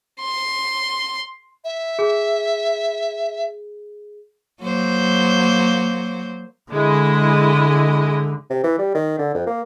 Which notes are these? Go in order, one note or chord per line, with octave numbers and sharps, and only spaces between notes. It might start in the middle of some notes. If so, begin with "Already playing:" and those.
C6
E5
G#4
F#3 A#3 C5
D3 G#3 E4 D#5
C3
E3
G3
D#3
D3
F2
A#3